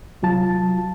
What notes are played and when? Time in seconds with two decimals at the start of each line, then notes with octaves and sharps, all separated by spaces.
0.22 C2 F#3 F4 A5